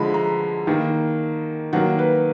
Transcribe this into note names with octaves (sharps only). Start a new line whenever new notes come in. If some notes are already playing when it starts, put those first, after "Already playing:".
Already playing: D3 F3 G#3 B5
A#5
D#3 A#3
D#3 F#3 A#3 F#5
B4